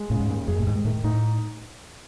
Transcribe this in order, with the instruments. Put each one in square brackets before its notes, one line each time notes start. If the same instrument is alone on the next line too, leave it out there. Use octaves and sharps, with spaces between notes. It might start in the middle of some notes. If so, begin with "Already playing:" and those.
Already playing: [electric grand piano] G#3
[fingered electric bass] A2 [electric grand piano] C#3
[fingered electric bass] G#2
[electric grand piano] D#2
[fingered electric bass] F#2 [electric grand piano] G#4
[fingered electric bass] A2
[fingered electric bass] G#2 [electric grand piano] D#3
[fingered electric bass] A2 [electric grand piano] D#3
[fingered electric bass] A2 [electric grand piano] D#4